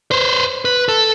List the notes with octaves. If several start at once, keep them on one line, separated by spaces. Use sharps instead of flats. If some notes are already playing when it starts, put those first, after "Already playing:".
B4 C5
B4
A4